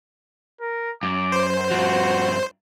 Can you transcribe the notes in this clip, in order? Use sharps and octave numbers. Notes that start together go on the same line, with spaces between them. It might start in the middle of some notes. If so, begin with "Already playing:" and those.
A#4
F#2 D6
C5
G2 F3 F#4